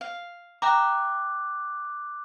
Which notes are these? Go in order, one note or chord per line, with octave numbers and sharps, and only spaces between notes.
F5
E5 G5 A#5 D6 F#6